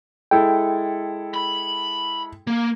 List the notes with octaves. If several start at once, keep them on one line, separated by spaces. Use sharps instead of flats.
G#3 E4 A4 G5
B5
A#3